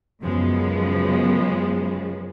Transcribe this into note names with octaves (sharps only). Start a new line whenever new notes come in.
F#2 C#3 F3 G#3 B3